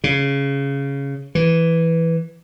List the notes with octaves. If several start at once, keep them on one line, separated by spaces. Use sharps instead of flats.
C#3
E3